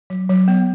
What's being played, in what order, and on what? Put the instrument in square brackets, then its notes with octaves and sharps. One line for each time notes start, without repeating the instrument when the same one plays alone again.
[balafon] F#3
F#3
B3